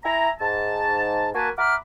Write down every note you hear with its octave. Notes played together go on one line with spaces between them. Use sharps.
E4 E5 G#5 A#5
G#2 A5
A#3 F#4 A#4 B4 G#5 A5
E5 F#5 A#5 B5 D6 F6